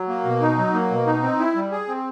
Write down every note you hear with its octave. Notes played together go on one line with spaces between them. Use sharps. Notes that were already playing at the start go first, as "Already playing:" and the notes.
Already playing: F#3
A#3
B2
D#4
F#3
A#3
B2
D#4
C4
E4
G3
G#4
C4